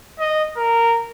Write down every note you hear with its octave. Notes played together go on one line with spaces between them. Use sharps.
D#5
A#4